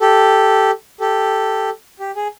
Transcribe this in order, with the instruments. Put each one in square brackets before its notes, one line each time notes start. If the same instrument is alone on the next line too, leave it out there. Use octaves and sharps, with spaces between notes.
[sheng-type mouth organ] G4 A4
G4 A4
G4
G#4